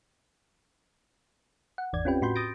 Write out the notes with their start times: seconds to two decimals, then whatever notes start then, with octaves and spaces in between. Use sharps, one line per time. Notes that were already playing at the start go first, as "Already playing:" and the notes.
1.78 F#5
1.93 G#1 E2 D5 G#6
2.05 C4 C#4 F4 G4 B4 G5
2.22 A2 F#4 B5 C6 G6
2.36 D#6 G6 A6 A#6 D7